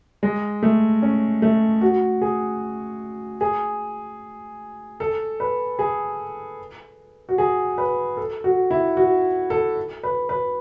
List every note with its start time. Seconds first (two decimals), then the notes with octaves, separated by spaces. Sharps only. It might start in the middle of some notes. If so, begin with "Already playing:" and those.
0.23 G#3
0.63 A3
1.02 C#4
1.42 A3
1.81 F#4
2.22 G#4
3.41 G#4
5.00 A4
5.40 B4
5.79 G#4
7.29 F#4
7.38 G#4
7.78 B4
8.17 A4
8.44 F#4
8.71 E4
8.97 F#4
9.50 A4
10.03 B4
10.29 B4